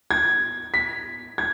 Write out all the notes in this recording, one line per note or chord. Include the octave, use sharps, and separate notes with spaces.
G#6
B6
G#6